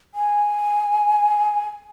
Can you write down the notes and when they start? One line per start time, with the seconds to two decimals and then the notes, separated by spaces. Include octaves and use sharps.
0.14 G#5